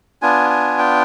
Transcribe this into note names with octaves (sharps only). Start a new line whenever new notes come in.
B3 D4 F4 G#5
G#5
G5